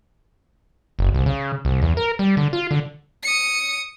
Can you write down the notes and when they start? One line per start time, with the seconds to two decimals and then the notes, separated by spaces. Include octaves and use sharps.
0.99 F#1
1.15 C2
1.26 C#3
1.65 C2
1.82 E2
1.97 A#4
2.19 G3
2.37 D3
2.53 F4
2.71 D3
3.23 D#6 C#7